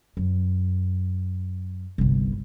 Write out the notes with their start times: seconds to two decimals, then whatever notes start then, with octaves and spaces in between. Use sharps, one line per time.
0.17 F#2
1.98 G1 C2